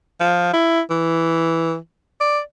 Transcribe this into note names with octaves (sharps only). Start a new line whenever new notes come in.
F3
E4
E3
D5